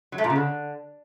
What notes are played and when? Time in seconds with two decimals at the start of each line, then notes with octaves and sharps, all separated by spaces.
0.12 F#3
0.18 A3
0.24 A#2
0.30 C#3
0.36 D3